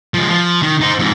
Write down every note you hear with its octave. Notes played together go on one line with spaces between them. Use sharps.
F3 G#3
F3
D#3
D#4 C5
F2 G#2